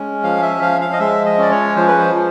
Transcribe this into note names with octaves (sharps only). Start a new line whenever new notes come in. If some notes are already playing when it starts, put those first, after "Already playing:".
Already playing: G#3 C#4
F3 F5
E5
F3 F5
F5
D#5
G#3 E5
D#5
C#4 D5
C#5
F3 C5
B4
C5
F3